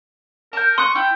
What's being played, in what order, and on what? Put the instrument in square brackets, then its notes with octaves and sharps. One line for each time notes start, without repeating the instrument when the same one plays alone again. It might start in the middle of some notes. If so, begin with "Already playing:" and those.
[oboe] A#4 [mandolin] A5 G6
[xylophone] C6 [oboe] C#6 [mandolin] D#6 F#6
[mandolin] E4 [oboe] G5